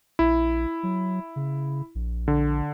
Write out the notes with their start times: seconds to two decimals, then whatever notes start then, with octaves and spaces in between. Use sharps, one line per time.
0.19 A#1 E4
0.83 F#3
1.36 C#3
1.95 A#1
2.28 D3